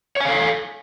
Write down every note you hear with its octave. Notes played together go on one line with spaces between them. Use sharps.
A4 C#5 F5 G#5